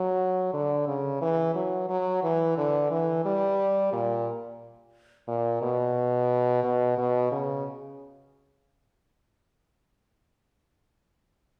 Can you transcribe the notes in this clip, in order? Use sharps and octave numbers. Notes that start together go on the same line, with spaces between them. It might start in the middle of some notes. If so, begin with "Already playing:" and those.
Already playing: F#3
D3
C#3
E3
F#3
F#3
E3
D3
E3
G3
A#2
A#2
B2
B2
B2
C#3